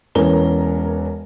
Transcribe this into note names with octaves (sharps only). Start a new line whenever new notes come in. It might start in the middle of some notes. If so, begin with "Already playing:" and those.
E1 E3 C#4 A#4 A#5 G7